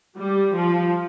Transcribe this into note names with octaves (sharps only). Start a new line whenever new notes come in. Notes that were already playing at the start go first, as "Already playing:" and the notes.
G3
F3